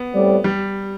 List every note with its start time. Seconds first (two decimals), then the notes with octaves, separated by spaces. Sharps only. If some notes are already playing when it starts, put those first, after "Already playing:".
Already playing: B3
0.13 A2 G3 C4 G4 D5
0.44 G3